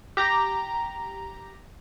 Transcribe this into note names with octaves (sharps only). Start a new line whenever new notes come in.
G4 A#5